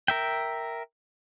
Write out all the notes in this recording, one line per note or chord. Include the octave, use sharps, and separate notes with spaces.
A#4 E5 G5